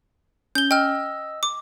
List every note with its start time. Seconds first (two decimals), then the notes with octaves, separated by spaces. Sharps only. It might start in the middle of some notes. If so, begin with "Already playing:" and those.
0.55 C#4 G6 G7
0.71 D#5 G5 E6 F6
1.43 D6